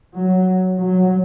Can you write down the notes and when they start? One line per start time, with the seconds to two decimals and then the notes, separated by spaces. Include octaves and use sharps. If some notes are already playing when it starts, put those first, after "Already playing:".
0.14 F#3
0.78 F#3